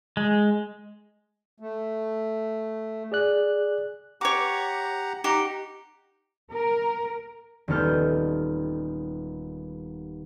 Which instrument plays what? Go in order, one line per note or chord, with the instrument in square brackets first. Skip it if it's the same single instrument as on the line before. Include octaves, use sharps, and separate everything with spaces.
[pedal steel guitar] G#3
[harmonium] A3
[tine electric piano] G#4 D5 F#6
[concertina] G4 F#5 A#5 [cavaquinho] C#5 D6
[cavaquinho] D#4 G4 [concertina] F#5
[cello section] A#4
[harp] D#1 D#3 B3 A4 F6 G6